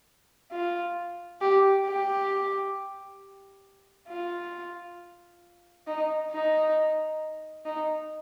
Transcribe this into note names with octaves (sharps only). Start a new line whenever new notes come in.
F4
G4
G4
F4
D#4
D#4
D#4